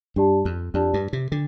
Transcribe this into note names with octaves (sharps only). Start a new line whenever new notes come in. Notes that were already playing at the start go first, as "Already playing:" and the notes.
G2 D4 G4 D5 A5
F2
F2 D4 G4 D5 A5
G2
C3
D3 D4